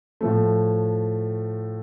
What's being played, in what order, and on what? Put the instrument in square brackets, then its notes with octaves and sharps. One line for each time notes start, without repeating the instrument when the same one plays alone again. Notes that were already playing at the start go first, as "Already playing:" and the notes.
[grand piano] A2 F3 A3